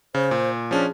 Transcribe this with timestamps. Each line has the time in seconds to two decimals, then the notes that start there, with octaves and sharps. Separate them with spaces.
0.15 C#3 C5
0.31 A#2
0.71 F3 C#4 D4 G#4